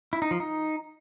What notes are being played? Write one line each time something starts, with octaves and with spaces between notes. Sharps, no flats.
E4
D#4
F3
D#4